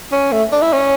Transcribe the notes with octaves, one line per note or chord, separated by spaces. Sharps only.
C#4
A3
D4
E4
C#4